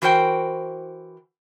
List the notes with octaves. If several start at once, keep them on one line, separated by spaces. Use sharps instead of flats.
E3 F#4 A#4 C5 G5